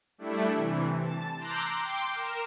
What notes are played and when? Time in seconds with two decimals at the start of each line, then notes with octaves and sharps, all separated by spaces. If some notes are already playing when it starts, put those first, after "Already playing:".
0.18 G3 A3 D4 E4
0.53 C3 E3
1.01 A5
1.38 A#5 C6 D6 E6 F#6 G6
1.76 G5 C6 D6
2.09 A#4 E7